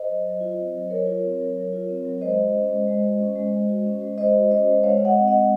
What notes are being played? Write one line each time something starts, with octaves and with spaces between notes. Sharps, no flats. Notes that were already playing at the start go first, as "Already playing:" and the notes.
Already playing: C5 D#5
F#3
F#3
F4
C4
F#3
F#3 A#4 C#5
F4
C4
F#3
F#3
F4
C4
F#3
G#3 C5 D#5
F#4
C#4
G#3
G#3
F#4
C#4
G#3
G#3
F#4
C#4
G#3
G#3 C5 D#5
F#4
C#4 C5 D#5
G#3
G#3 C#5 F5
F#4
D#5 F#5
C4
G#3 D#5 F#5